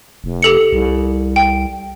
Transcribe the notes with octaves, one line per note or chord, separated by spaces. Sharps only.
F1
G4 A4 C#7
C2
G5